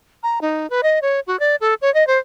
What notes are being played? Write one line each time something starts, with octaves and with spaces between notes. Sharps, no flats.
A#5
D#4
B4
D#5
C#5
F#4
D5
A4
C#5
D#5
C5